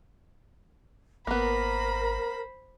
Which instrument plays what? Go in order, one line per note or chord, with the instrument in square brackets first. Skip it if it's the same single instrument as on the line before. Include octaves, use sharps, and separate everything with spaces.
[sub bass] G#1 [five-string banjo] A#3 B3 [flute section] A#4 [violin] C5 B5